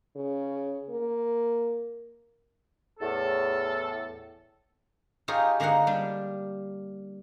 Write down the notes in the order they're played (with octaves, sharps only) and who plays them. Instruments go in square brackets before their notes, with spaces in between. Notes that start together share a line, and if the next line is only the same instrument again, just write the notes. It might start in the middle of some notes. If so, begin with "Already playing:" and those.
[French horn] C#3
A#3
[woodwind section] E2 A2 A4
[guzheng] D#4 F4 G4 G#4 A#4 C#5
D3 A#3 D#4 A#4 F#5
G3 D4